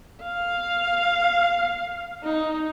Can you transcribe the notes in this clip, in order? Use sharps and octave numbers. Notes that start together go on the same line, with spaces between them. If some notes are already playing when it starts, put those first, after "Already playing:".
F5
D#4